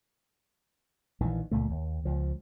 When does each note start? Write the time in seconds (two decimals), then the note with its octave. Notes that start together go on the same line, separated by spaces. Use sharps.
1.20 A#1 D#3 E3
1.51 C#2 A#2 A3
1.70 D#2
2.05 C#2 F3